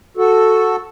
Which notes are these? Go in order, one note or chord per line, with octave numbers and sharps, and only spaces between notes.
F#4 A4